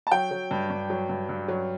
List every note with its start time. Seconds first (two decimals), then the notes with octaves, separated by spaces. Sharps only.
0.07 A5
0.12 F#3 G5
0.31 F#3
0.51 G2
0.70 G2
0.90 F#3
1.09 G2
1.29 G2
1.48 F#3